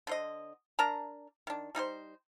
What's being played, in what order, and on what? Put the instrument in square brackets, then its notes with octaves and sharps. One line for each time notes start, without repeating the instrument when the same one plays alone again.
[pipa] D3 C5 D#5
D4 A#4 A5 A#5
D#3 D4
G3 D#4 G#4 C5